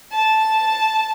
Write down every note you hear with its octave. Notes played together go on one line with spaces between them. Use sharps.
A5